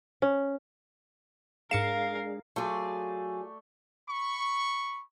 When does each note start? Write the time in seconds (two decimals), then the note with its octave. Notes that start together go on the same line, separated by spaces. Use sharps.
0.22 C#4
1.71 G#2 G#3 D4 G#4 A#4 F5 C#7 E7
2.56 F#3 A3 F4 G#4 D5
4.08 B5 C#6